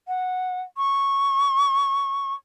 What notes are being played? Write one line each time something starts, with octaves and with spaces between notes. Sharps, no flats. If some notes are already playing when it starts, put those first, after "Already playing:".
F#5
C#6